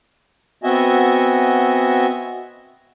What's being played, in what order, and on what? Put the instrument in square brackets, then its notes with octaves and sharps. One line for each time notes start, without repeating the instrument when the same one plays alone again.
[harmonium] B3 C4 F#4 D#5 E5 G#5